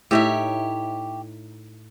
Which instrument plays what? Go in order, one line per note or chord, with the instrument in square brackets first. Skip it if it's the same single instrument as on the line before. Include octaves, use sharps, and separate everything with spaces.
[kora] A2 D#4 [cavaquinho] G4 C#5 E5